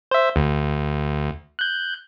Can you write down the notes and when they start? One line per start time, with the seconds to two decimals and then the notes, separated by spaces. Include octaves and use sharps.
0.11 C5 E5
0.36 D2
1.59 F#6 G6